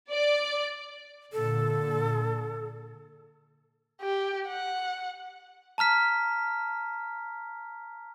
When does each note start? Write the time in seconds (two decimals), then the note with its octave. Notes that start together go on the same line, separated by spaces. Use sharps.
0.12 D5
1.33 A#2 D3 A4
4.02 G4
4.48 F#5
5.78 A5 A#5 F6 B6